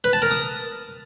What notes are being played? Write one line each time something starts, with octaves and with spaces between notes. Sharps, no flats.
B4
A5
A#4
D#6